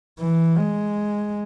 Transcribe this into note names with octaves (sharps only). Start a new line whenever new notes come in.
E3
G#3